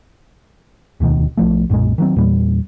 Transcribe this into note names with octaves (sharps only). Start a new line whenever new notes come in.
E1 D2 B2 D#3
B1 F3 A3
B1 F#2 A#2 G#3
D#3 F#3 C4
E2 A#2 G3